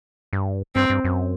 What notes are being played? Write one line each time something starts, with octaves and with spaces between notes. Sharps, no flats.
G2
G2 C4
G2
F#2